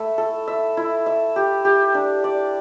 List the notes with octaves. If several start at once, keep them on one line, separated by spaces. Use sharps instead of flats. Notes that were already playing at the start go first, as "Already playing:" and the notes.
Already playing: A3 E4 E5
A4
E5
E4
E5
G4
G4
D4
D5